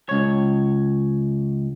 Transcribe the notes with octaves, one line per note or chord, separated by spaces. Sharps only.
C#2 C#5